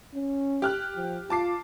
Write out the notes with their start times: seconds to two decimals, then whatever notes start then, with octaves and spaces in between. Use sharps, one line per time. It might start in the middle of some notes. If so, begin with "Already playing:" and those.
0.15 C#4
0.62 G4 F6 F#6
0.96 F3
1.30 F4 A5 D6 C7